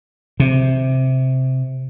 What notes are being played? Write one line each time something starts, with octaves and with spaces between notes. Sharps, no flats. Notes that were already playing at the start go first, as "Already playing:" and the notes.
C3